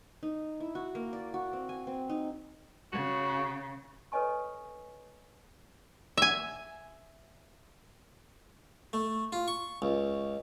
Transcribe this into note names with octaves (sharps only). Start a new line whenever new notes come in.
D#4
E4
F#4
A#3
D5
F#4
C4
G#5
C4
D#4
C#3 F#4
A4 B4 C#5 D#5 G#5 C#6
E5 G#5
A3
F4
C#6
C#2